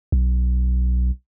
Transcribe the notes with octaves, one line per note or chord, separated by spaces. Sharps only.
B1